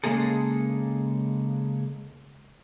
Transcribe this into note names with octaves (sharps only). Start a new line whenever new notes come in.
C#3 G#3 A#3 G#4 A4